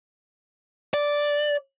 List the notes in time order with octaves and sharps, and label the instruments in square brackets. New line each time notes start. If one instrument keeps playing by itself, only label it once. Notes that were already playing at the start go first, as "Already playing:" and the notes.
[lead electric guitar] D5